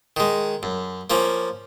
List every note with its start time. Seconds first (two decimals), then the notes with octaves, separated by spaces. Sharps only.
0.17 D#3 G#3
0.63 F#2
1.10 F3 A#3 C#4